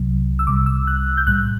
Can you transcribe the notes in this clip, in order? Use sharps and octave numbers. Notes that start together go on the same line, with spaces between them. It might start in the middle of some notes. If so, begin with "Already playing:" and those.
Already playing: C2 C3 F#3
E6
C2 C3 G3 D6
E6
F#6
G6
B1 A2 G3 F#6